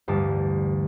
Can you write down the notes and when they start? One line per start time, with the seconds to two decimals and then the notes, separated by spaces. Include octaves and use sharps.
0.08 A1 D2 G2 A5